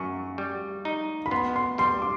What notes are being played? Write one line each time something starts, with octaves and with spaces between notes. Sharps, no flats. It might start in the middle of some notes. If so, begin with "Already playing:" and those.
Already playing: F#2 C#6
G3
D#4
B5
B3 C6
C6
G3 C6
D6